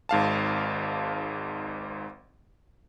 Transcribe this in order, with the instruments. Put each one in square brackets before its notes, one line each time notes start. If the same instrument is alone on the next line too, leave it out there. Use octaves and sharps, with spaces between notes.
[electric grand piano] G#1 G#2 F5 A5